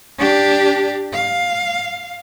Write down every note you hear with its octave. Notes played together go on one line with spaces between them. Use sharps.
D4 G4
F5